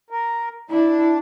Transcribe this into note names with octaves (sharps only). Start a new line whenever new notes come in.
A#4
D4 E4